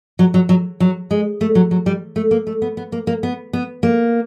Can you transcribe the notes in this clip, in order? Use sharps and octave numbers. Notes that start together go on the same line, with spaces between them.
F#3
F#3
F#3
F#3
G#3
A3
F#3
F#3
G3
A3
A#3
A3
B3
B3
A#3
A#3
B3
B3
A#3